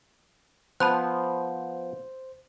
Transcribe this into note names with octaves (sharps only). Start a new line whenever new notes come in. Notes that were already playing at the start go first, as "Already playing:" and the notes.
F3 B3 C5 A5 B5 F#6